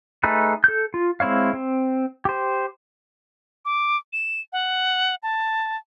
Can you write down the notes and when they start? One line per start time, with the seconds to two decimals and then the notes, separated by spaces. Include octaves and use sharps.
0.23 A3 D#4 G#4 A4 B4
0.64 A4 G6
0.94 F4
1.20 G#3 C4 E4 C#5 F5
1.54 C4
2.25 G4 C5
3.65 D6
4.13 E7
4.53 F#5
5.23 A5